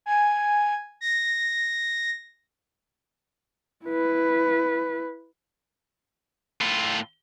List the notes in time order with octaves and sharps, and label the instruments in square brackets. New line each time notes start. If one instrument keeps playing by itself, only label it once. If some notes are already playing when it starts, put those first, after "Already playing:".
[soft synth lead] G#5
A#6
[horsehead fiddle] E4 B4
[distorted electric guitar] A2 F4